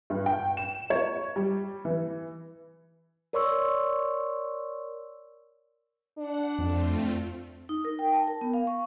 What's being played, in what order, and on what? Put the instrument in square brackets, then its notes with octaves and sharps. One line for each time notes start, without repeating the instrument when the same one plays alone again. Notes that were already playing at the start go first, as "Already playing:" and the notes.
[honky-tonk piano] G2
G5
E7
C#5
G3
E3
[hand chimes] A#4 C#5 D5 C6 C#6 E6
[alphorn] D4 [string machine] F#5
[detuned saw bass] F2 [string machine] A3 C4 F4
[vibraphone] D#4
A#4
G5
A5
A#4
B3
F5
C#6